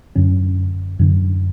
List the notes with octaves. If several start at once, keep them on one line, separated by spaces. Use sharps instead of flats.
F#2 D3 C#4
F#2 D3